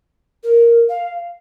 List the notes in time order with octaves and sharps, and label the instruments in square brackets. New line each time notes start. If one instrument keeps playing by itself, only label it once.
[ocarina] A#4
F5